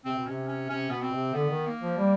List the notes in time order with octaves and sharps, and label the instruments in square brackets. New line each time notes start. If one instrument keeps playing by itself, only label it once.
[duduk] C3 [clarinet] C4
[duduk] B2
[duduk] C3 [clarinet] C#4
[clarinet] C#4
[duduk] C3 [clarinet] C#4
[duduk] B2 [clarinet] B3
[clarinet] C4
[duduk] C3
[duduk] D3 [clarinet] B3
[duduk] D#3
[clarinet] A#3
[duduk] F3
G3